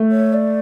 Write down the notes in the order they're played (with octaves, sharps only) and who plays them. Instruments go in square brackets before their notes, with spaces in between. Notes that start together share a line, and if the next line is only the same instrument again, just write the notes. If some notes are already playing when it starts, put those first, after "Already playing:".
Already playing: [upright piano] A3
[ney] C#5
D5